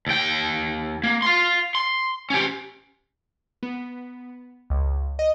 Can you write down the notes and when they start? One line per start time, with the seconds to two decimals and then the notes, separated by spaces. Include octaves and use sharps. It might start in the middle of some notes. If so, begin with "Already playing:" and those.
0.07 D#2 G5
1.03 A#3
1.22 F5 C6
1.75 C6
2.30 C#4 G4
3.63 B3
4.70 C#2
5.19 D#5